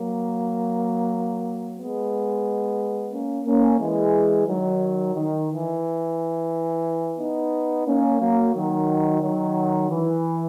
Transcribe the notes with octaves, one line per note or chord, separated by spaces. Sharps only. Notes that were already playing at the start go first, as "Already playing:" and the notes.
Already playing: F#3 A#3
G#3 B3
A#3 C#4
A#3 C#4
E3 G#3
D#3 F#3
D#3
E3
B3 D#4
A#3 C#4
F#3 A#3
D#3 F#3
D#3 F#3
E3